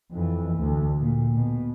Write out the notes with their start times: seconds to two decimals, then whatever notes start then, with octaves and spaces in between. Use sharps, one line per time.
0.11 F2 E3
0.57 D2
1.00 A#2
1.34 B2